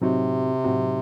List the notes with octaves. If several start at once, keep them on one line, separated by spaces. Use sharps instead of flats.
A2 C3 F#3 C4 D#4 F#4
A2 F#3 C4 D#4 F#4